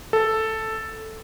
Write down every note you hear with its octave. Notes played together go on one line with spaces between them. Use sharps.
A4